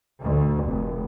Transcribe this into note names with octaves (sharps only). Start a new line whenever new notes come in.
D2
F1